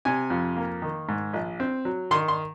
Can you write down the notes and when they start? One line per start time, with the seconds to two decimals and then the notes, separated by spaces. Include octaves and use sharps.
0.05 C3 G#5
0.30 F2
0.57 A#3
0.82 D#3
1.09 G#2
1.33 A#1
1.60 C4
1.85 F#3
2.11 D#3 C6
2.28 C6